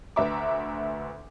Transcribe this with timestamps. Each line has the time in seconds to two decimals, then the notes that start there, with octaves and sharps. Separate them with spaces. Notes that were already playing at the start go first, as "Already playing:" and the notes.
0.16 D2 B4 E5 A#5 D6